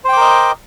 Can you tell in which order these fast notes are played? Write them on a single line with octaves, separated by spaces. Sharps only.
C5 G5 D6 A#4 D#5